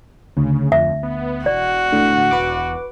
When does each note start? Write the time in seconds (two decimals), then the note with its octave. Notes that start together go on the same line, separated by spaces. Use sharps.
0.37 D2 C#3
0.72 F2 E5
1.03 B3
1.46 E1 F#4 D5
1.92 A2 D3
2.31 E1 B4 D6